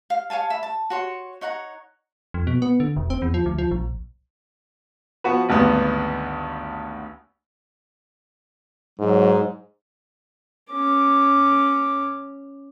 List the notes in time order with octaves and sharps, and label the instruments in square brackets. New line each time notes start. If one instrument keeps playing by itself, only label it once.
[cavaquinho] F5
C#5 F5 G#5 A5
E5 B5
A5
F#4 C#5 C6
D#4 C#5 F#5 A#5
[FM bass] F2
B2
B3
D3
E1
C4
E2
F3
D2
F3
A#1
[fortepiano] F3 B3 F#4 B4
G#1 D2 G2 B3
[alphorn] G#2 [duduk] F#3
[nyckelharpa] C#4 D6